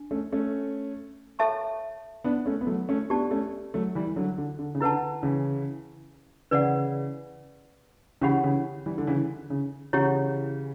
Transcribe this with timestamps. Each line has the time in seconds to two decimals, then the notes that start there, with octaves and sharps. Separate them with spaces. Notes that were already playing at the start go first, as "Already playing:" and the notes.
Already playing: D4
0.11 A3 C#4
0.32 A3 C#4
1.39 A4 C#5 E5 A5 C#6
2.24 B3 D4
2.46 A3 C#4
2.61 B3
2.67 F#3 A3
2.89 A3 C#4
3.10 B3 D4 G4 D5 A5
3.31 A3 C#4
3.74 F#3 A3
3.95 E3 G3
4.16 D3 F#3
4.38 D3
4.59 D3
4.75 C#3
4.81 D3 E4 B4 F#5 A5
5.23 C#3 E3
6.51 C#3 E3 B4 D5 F#5
8.21 C#3 E3 C#4 G4 C#5 F#5 B5
8.44 C#3 E3
8.86 E3 G3
8.98 D3
9.07 C#3 E3
9.50 C#3
9.93 C#3 E3 E4 G4 C#5 F#5